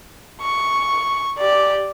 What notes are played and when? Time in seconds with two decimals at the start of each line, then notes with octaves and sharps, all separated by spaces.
0.41 C#6
1.38 G4 D5